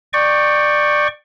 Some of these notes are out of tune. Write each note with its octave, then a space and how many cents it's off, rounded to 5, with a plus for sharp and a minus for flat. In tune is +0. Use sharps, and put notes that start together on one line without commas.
D5 +20 G5 +0 C#6 +0